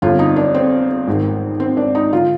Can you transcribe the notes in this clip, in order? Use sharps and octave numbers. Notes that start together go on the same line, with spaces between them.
G1 F2 D3 F4
D#4
D4
C4
G#1 G#2 D#3
C4
D4
D#4
D3 F4